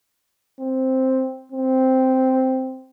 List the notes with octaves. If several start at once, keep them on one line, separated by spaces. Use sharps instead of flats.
C4
C4